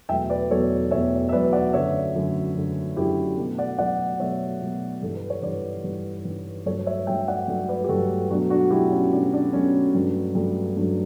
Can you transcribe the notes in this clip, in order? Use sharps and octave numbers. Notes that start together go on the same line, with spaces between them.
E2 B2 F#3 A3 E5 G5
B4 D5
E2 B2 F#3 A3 A4 C#5
E2 B2 F#3 A3 C#5 E5
E5
E2 B2 F#3 A3 B4 D5
D5 F#5
F#2 D3 A3 C#5 E5
F#2 D3 A3
F#2 D3 A3
F#2 D3 A3 E4 G4
B2 F#3 A3
D5 F#5
B2 F#3 A3 D5 F#5
B2 F#3 A3 C#5 E5
B2 F#3 A3
G2 E3 G3 A4
B4
C#5
G2 E3 G3 B4 D5
G2 E3 G3
G2 E3 G3
G2 F#3 A3 A4 C#5
C#5 E5
G2 F#3 A3 E5 G5
D5 F#5
G2 F#3 A3
B4 D5
G4
G2 F#3 A3 F#4 A4
B2 F#3 A3 D4 F#4
D4 F#4
B2 F#3 A3 E4 G4
C#4
B2 F#3 A3 D4
D4
B2 F#3 A3 C#4
G2 F#3 A3
G2 F#3 A3
G2 F#3 A3 D4